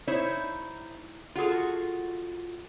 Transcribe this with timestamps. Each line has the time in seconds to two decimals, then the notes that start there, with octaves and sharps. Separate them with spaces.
0.07 D#4 E4 C5 C#5
1.35 F4 F#4 G#4 A4